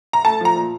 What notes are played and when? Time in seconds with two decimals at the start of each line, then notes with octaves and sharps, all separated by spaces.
0.13 A#5
0.25 A3 A5
0.41 F3 A#5
0.56 A#2